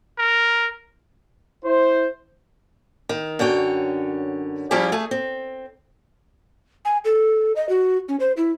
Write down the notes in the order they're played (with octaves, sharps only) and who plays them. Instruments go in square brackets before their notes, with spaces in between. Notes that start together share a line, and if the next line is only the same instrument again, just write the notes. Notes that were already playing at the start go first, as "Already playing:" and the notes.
[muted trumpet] A#4
[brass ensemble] E4 C5
[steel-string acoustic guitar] D#3
F#2 D3 C#5 G5
F3 G3 C#4 E4 G4 G#4
A3 G#4
C4
[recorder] G#5
A4
D#5
F#4
C#4
C5
E4